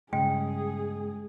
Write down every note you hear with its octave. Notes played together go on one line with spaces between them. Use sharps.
G2 C#3 G#3 G#4 G5